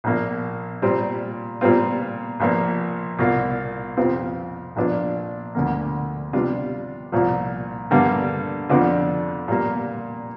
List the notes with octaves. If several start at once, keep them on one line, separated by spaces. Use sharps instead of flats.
A#1 A#2 A#3
A#2 G3 C4 F4
A#2 G3 C4 F4
A#1 A#2 F3 A#3
C2 A#2 A#3 F4
F2 C3 F3 C4 F4
A#1 A#2 F3 D4 F4
D2 D3 A#3
C3 G3 D4 F4
C2 A#2 F3
G2 D3 G3 A#3
F2 D3 F3 D4 F4
A#2 G3 A#3